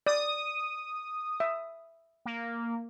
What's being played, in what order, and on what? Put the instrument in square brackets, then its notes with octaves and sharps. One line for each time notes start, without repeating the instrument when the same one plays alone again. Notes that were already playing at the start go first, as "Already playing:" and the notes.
[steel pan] D5 [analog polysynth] D#6
[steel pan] E5
[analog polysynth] A#3